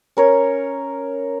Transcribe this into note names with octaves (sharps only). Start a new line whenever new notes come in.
C#4 A#4 C#5